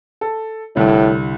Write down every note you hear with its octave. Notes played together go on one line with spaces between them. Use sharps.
A4
C2 A2 D3